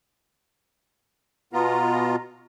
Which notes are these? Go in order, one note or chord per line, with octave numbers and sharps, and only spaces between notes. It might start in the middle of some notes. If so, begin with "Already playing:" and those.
B2 B3 F4 A#5